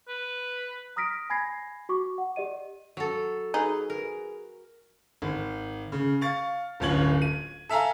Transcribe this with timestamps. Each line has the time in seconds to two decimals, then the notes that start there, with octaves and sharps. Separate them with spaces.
0.08 B4
0.96 A#5 D#6 F6 A#6 B6 D7
1.30 G#5 B5 G#6 A#6 C7
1.89 F#4 C#6 D6
2.18 F#5
2.36 G4 D5 D#5 D#7
2.97 F#3 A4
3.54 D#4 G#4 B4
3.90 A#4
5.22 G#1
5.92 C#3
6.21 F5 C#6 A6
6.80 D1 G1 C#4 F4 G#6 F#7
7.22 D#7
7.69 A4 E5 F5 G#5 A#5